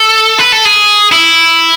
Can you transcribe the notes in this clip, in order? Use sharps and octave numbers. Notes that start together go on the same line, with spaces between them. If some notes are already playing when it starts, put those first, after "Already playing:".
Already playing: A4
B4
A4
G#4
E4